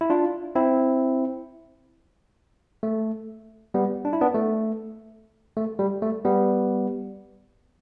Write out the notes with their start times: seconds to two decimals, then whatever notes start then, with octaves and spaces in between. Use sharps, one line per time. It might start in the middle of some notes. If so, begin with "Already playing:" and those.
0.01 E4
0.10 D4 F4
0.55 C4 E4
2.83 A3
3.74 G3 B3
4.05 D4
4.13 E4
4.21 B3 D4
4.35 A3
5.57 A3
5.79 G3
6.02 A3
6.25 G3 B3